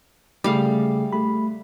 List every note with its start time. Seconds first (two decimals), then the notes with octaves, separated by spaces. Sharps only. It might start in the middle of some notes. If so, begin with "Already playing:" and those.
0.44 C#3 G3 A3 G#4 F5
1.13 A3 G4 B5